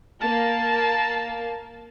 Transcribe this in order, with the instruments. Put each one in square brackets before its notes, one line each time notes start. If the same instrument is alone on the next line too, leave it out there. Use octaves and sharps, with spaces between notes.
[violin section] A#3 [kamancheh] A5